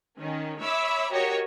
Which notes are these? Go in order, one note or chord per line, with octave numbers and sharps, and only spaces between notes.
D#3 C#4
C#5 E5 B5 D6 E6
F#4 G4 A#4 C#5 D#5